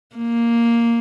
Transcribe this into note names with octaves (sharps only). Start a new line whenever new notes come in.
A#3